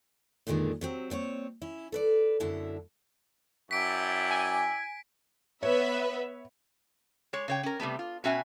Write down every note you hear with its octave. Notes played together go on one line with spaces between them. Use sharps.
F2 A#2 D3 D#3 G#3
C3 F#3 C4
A#2 C4 C5 C#5
C#4 E4
A4 B4 D5
F#2 B2 D3 E4 E5 A5
F#2 E4 D5 G5 B6 D7
G#5
B3 B4 C#5 E5
G#3 C#5
C#3 C#5 G5
C#4 A#4
C3 G3 A3 B3
F4
B2 C#4 F#4 E5 G5 G#5